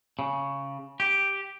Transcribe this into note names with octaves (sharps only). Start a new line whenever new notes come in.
C#3
G4